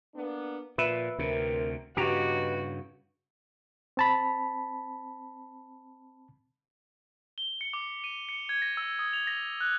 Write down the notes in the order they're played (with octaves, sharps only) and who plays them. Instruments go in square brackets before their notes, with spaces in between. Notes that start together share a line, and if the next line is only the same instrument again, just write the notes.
[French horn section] A#3 B3 D4
[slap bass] A#2 [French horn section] F3 F4 [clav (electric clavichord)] B4 E5
[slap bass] D2 C3 [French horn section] C4 A#4
[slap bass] G2 C#3 [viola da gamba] F#4 [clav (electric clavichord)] G4 A#5 [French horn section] B4 D#5
[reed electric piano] C4 A5 B5
[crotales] G7
C#7
D6
D#7
C#7
G#6
A#6
E6
D#6
F7
A#6
F#6